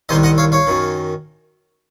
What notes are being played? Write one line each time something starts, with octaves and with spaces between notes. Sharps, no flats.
C2 C3 D#3 C5 D#5
D#5 F#5
C#5 F5
C#5 F5
F#2 D#3